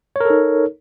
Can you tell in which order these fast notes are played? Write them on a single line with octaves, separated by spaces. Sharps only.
C#5 A#4 A4 D#4